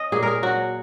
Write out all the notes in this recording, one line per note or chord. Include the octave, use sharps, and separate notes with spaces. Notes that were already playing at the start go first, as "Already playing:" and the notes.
Already playing: C#4 D#5
A#2 G#4
G#4 A#4
F#3 C#4 F#4